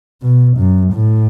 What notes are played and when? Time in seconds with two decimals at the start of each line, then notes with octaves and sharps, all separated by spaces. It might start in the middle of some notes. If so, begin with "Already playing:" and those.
0.22 B2
0.58 F#2
0.93 A2